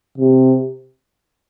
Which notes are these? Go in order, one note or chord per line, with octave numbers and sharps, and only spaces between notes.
C3